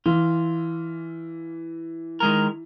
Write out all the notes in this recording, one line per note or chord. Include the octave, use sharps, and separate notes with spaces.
E3 F4
D#3 G#3 A#4